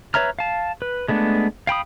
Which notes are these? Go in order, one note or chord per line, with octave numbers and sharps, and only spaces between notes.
B4 C#5 E5 A#5 F6
F5 A5
B4
G#3 A3 B3 D4
F5 G5 B5 D#6